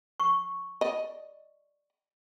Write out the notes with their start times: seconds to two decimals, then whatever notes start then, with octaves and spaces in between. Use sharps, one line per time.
0.20 C#6
0.81 D5 D#5